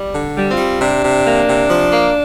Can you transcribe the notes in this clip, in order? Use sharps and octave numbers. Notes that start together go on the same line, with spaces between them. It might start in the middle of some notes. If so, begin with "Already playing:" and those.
Already playing: G3
D3
G3
C4 F4
G3
C3 D4
C3
A#3
C3
F3
A#3